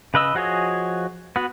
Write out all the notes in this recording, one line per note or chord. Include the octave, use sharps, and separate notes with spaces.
C#3 B4 D#5 E6
F3 F#4 G#4 C#5 D#5
B3 F#4